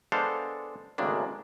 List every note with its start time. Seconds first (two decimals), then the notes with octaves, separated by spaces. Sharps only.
0.12 G#3 B3 D4 A4 C5 F5
0.98 G#1 A2 C#3 G#3 A#3 D4